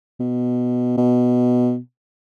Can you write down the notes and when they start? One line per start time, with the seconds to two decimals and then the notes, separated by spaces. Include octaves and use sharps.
0.20 B2
0.97 B2